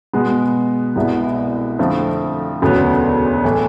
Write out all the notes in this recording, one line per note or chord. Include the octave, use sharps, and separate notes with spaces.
B2 G#3 B3
C2 B2 G#3 B3 E4
F2 D3 F3 A3
E1 D2 C#3 F#3 B3
A2 E3 A3